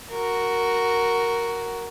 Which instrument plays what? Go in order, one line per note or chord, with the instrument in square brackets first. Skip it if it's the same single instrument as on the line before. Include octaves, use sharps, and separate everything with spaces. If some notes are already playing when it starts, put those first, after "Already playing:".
[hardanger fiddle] F#4 A#4